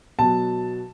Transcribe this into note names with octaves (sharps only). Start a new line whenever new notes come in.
B2 F#3 A5